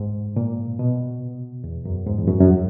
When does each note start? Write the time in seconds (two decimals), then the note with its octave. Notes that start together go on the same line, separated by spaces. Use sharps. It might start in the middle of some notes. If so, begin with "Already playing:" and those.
Already playing: G#2
0.36 A#2
0.79 B2
1.64 E2
1.85 F#2
2.06 G#2
2.18 E2
2.28 F#2
2.40 F#2